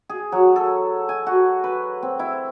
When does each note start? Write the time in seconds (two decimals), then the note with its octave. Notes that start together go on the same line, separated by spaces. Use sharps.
0.09 G#4
0.32 F#3
0.56 A4
1.09 G#5
1.27 F#4
1.64 B4
2.03 C4
2.19 E4